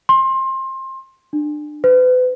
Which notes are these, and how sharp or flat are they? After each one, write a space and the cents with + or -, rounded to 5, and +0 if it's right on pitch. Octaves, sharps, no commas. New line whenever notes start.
C6 +25
D4 +30
B4 +40